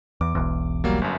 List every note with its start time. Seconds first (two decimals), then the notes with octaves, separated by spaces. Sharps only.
0.21 E2 D6
0.35 E1 B1 E2
0.84 F#3 G3 A#3
1.02 G1 F#2